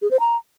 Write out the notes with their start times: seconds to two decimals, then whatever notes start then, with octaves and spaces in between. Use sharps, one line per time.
0.02 G#4
0.11 C5
0.20 A#5